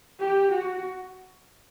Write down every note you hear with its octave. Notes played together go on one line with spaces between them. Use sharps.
G4
F#4